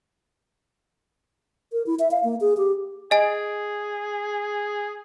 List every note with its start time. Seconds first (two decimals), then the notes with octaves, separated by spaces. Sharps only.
1.73 A#4
1.86 E4
1.99 E5
2.11 F5
2.24 A#3
2.41 G#4
2.57 G4
3.11 G#4 D#5 G#5